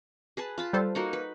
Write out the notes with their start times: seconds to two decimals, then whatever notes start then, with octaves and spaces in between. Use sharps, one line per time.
0.37 G#4 B4 A5
0.58 F4 A5 B5
0.73 G3 A4 C5
0.95 A#3 D#4 F#4
1.13 B4